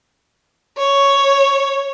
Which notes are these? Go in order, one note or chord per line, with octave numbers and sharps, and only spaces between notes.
C#5